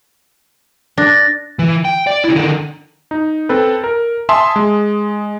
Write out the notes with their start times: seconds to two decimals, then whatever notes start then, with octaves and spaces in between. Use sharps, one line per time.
0.98 D4 F#6 A6 A#6
1.59 E3
1.85 G5
2.07 D5
2.24 C#3 E4
2.36 D3 D#3
3.11 D#4
3.49 C4 A4 B4
3.84 A#4
4.29 E5 G#5 A5 C6 D#6
4.56 G#3